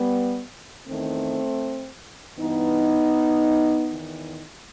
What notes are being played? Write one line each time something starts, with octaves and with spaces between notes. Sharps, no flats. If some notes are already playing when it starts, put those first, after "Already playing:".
Already playing: G3 B3
E2 D#3 A3 C4
G2 E3 B3 D#4
E2 D#3